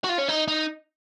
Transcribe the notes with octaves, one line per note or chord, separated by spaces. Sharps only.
F#4
F4
C#4
D#4
D#4